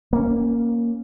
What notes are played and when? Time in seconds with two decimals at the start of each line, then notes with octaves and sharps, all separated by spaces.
0.13 A#3 C#4